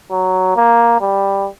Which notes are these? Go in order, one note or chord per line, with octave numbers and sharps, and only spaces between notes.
F#3
A#3
G3